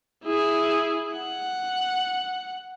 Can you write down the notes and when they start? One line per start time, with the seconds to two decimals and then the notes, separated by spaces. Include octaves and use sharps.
0.24 E4 G#4
1.13 F#5